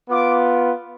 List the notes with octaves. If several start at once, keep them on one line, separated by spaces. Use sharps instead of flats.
B3 F4 D6